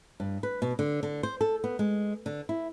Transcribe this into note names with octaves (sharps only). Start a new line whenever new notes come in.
G2
B4
B2
D3
D3
C5
A4
B3
G#3
D3
E4